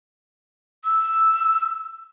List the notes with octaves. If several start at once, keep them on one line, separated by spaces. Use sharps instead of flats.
E6